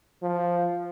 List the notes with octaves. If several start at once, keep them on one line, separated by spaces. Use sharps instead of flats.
F3